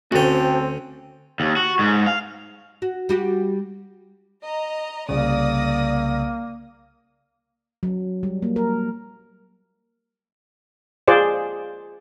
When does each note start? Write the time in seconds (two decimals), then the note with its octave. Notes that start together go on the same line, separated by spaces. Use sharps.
0.12 D2 C4 C#4 F#4 A4 G5
1.40 D#2
1.57 F#4
1.79 G#2
2.06 F5
2.82 F#4
3.09 G3 F#4 G4
4.43 D#5 A#5
5.09 C2 C#3 A#3 D5 D#6 A#6
7.83 F#3
8.23 G3
8.42 A#3
8.56 A#4
11.08 F4 G#4 C5 D5